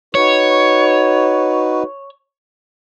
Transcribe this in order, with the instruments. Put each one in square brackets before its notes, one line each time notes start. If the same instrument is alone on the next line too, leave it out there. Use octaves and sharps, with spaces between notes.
[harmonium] D#4 F#4 B4 [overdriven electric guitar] C#5